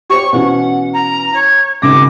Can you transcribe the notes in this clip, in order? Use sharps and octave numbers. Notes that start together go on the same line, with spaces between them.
G4 C5 C#5 C#6
B2 E3 C#4 F#5
A#5
C#5
G#1 C#3 D6 A#6